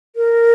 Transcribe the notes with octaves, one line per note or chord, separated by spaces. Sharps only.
A#4